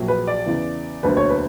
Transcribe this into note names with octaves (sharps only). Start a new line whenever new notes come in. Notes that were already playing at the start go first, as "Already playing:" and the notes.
Already playing: A#1 A#2 F#3
B4
D5
E2 C#3 E3
E1 D2 D3 F#3 A#3 B4
C#5
B4